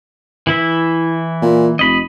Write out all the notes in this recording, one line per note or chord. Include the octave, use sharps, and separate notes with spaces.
E3 E4 E5
A#2
F1 D#5 B5